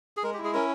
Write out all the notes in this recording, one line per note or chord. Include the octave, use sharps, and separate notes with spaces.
G#4
G#3 A#4
G4
E4
G#4
C#4 A#4